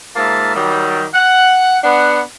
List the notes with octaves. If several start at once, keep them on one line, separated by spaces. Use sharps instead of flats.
G#2 A#3 F4 E5 A5
D#3 F#3 G3
F#5
B3 D4 F#5